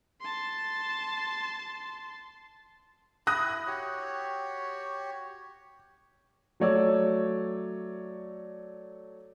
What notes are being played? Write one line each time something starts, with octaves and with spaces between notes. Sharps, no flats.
A5 C6
E4 D#6 F#6 A#6
F#4 G4 C#5
F#3 A3 C#5 D5 E6